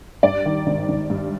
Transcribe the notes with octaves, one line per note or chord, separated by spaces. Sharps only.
G2 D5
D#3
G#1
G#1
G2